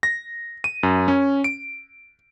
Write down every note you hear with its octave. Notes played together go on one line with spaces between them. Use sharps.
A#6
D#7
F#2
C#4
D7